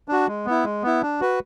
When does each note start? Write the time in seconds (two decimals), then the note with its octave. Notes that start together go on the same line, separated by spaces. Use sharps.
0.08 D4 F#4
0.28 G#3
0.46 B3 E4
0.65 G#3
0.83 B3 E4
1.02 D4
1.21 F#4 B4